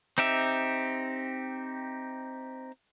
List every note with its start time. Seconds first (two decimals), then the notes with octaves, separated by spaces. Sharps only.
0.18 C4 D#4 G4 E5